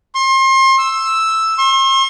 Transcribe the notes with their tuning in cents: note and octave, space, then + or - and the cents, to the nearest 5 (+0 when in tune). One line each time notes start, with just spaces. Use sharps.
C6 +35
E6 +0
C6 +45